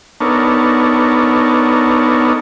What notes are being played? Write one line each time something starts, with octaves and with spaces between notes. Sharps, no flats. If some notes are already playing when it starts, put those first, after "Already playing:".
B3 D4 D#4 A4 A#4 C#5